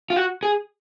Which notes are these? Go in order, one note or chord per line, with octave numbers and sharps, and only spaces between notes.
F4
F#4
G#4